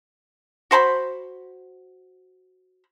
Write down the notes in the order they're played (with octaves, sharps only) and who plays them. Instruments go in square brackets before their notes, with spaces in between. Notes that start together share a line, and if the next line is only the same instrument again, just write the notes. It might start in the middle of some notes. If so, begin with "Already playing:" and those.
[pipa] F#4 C5 A5 B5